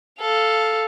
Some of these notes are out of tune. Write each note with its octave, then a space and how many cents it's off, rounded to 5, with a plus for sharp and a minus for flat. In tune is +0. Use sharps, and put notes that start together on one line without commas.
A4 +0 F5 +0